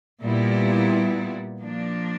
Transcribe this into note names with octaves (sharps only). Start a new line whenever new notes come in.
A#2 G3 B3 E4
F3 A#3 D4